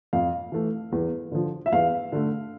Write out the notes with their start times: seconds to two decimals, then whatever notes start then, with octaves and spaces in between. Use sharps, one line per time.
0.13 F2 F5
0.52 E3 A3
0.92 E2
1.32 D3 F3
1.66 E5
1.72 E2 F5
2.12 D3 A3